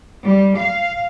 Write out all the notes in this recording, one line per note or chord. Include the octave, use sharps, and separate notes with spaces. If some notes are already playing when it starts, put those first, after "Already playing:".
G3
F5